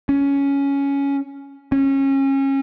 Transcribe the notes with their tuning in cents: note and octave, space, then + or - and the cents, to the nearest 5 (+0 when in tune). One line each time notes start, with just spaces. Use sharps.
C#4 +10
C#4 -25